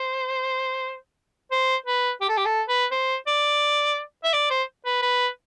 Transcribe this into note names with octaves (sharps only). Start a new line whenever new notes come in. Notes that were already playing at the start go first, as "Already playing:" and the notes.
Already playing: C5
C5
B4
G4
A4
G4
A4
B4
C5
D5
E5
D5
C5
B4
B4